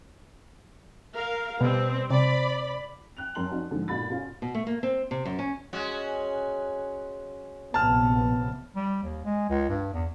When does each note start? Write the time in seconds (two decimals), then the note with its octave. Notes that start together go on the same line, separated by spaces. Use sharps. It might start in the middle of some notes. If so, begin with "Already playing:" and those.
1.15 A#4 F5
1.61 B2 G3 C4
2.11 C3 D5 B5
3.17 G5 F#6 F7
3.35 F#2 A#4 G5 A5 C6 F#7
3.51 F3 C4 C#4 D#4 F#4 D5
3.71 G#2 D3 F3
3.88 G1 A#2 D#4 F#4 B5 A6
4.09 B2 C#4 F4
4.42 B2
4.55 A3
4.67 A#3
4.83 C4
5.11 C3
5.25 F#2
5.39 C#4
5.73 G#3 C#4 F#4
7.74 A#1 C3 B3 A5 F6
8.76 G3
9.03 D#2
9.25 G#3
9.49 C#2
9.69 G2
9.93 E2